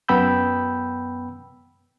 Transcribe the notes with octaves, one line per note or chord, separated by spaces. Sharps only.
F#2 B3 G5 B5 E6 G6